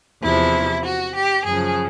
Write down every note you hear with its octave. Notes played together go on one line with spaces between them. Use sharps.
E2 C3 F3 E4
F#4
G4
F#2 C#3 F3 G#4